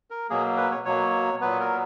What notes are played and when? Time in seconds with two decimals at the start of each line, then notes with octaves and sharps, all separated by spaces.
0.10 A#4
0.30 B2 F#3 A#3 G#4
0.57 B4
0.71 C#5
0.85 B2 F#3 A#3 C#5
1.41 A#2 F#3 B3 B4
1.60 A#4